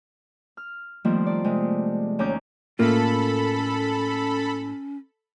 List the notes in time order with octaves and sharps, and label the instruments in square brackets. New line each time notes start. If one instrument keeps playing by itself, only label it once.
[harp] F6
D#3 F3 G3 A3 A#3 C4
D5
C3 G#3 A3
D#2 C#4 G#5 A#5 D6 G6
[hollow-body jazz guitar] A2 A#3 F4 [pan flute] C#4 [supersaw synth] A4 B5